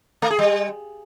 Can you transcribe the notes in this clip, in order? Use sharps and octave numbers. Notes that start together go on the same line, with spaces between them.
A3
G#4
G3